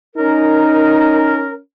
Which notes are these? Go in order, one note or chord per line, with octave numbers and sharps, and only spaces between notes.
C#4 D#4 A#4